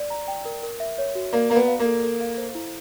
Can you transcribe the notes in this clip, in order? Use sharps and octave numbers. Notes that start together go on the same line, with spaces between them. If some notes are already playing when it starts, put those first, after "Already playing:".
Already playing: D5
A#5
G5
A#4
A#4
E5
C#5
F#4
A#3 D5
A#3 A#5
B3
F5
A#3
A4
A4
F5
C5
E4